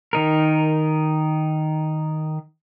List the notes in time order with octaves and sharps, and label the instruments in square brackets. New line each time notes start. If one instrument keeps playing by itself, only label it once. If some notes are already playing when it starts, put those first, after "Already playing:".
[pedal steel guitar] D#3 D#4 A#4